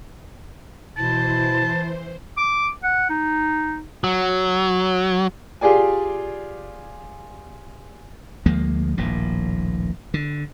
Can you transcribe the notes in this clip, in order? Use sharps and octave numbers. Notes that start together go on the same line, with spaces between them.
B2 E3 E4 C5 A5
D6
F#5
D#4
F#3
F4 G4 G#4 D5 G#5
D2 F3 G#3 A#3
D#1 A#1 A2
D3